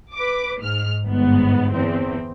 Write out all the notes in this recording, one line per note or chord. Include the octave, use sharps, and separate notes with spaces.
B4 D6
G#2 F6
G1 G#2 B3
E2 C4